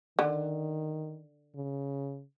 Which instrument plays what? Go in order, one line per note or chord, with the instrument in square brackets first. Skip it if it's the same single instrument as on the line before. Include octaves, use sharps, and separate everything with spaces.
[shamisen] D3 [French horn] D#3
[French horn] C#3